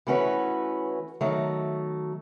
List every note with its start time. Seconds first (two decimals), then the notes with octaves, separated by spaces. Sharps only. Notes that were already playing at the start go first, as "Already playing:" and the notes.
0.07 E3 A3 C#4 F#4 B4
1.21 D#3 F#3 A3